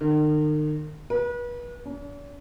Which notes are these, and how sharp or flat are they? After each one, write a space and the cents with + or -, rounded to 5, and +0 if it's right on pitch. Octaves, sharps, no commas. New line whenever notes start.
D#3 -40
B4 -35
D4 -45